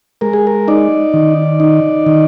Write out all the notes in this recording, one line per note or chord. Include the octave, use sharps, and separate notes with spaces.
G#3 A#4
G#4
A#4
D#4 D5
D#3
D#4
D#3